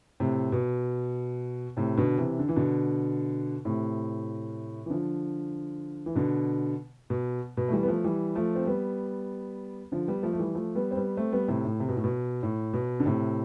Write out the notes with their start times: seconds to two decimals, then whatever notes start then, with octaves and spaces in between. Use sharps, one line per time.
0.20 A2 C3
0.52 B2
1.77 A2 C3
1.97 B2 D3
2.18 C3 E3
2.39 D3
2.49 E3
2.56 B2 D3
3.65 A2 C3
4.86 E3
4.90 D3 F3
6.06 E3
6.15 B2 D3
7.10 B2
7.57 B2
7.68 A3
7.72 E3 G3
7.83 B3
7.88 F3 A3
8.04 E3 G3
8.35 F3 A3
8.55 C4
8.66 G3 B3
9.92 D3 F3
10.08 G3 B3
10.23 F3 A3
10.33 A3
10.39 E3 G3
10.54 F3 A3
10.75 G3 B3
10.91 C4
10.96 G3 B3
11.17 A3 C4
11.32 G3 B3
11.48 A2 C3
11.65 A2
11.80 C3
11.88 B2
11.96 A2
12.04 B2
12.43 A2
12.74 B2
13.00 D3
13.06 A2 C3